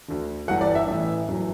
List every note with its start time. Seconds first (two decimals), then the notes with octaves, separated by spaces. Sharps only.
0.08 D2 D3
0.48 G1 G2 E3 F#5
0.61 D5
0.75 E5
0.88 A1 A2 E3 E5
1.28 G1 F#2 E3